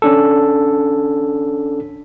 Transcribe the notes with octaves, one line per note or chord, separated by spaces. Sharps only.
C#4 D4 A4